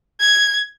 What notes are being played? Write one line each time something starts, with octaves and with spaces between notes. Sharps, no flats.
G#6